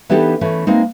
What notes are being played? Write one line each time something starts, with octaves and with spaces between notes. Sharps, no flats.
E3 B3 D4 D#4 G4 A4
E3 A3 C#4
G#3 A#3 C4 D#4